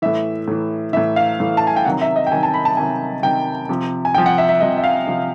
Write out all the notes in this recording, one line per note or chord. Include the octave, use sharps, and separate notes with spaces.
A2 E3 E5
A2 E3
A2 E3 E5
F5
A2 E3
A5
G#5
G5
C3 D#3 F#3 F#5
E5
D#5
G5
C3 D#3 F#3 G#5
A5
B5
A5
C3 D#3 F#3 G#5
C3 D#3 F#3 G5
C3 F3
G#5
C3 F3 G5
F#5
E5
E5
C3 F3 D#5
E5
F5
C3 F3